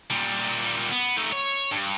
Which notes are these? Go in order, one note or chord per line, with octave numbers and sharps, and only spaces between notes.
A#2 G3
B3
A3 D#4
C#5
G2